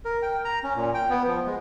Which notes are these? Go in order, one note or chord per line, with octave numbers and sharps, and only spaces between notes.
A#4
G5
A#5
C#4
A#2
G5
B3
F3
G#3